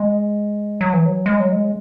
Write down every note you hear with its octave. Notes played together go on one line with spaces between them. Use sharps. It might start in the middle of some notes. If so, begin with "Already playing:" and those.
Already playing: G#3
F#3
E3
F#3
G#3
F#3
G#3